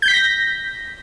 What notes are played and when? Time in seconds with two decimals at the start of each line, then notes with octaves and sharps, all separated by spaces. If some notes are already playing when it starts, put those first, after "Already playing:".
0.02 G6
0.08 B6
0.13 A#6